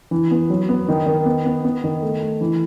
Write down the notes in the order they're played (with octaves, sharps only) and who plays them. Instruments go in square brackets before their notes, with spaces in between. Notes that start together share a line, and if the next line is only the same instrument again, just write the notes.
[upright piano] E3
B3
F#3
B3
D#3
D#3
B3
B3
B3
D#3
A3
A3
E3